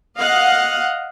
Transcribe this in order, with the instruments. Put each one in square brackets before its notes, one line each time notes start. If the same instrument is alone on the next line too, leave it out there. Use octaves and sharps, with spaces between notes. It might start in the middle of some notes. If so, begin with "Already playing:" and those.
[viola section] D#5 F5 F#5